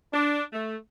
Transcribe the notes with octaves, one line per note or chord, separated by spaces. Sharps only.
D4
A3